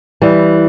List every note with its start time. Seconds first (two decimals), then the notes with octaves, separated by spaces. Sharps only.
0.22 E3 G3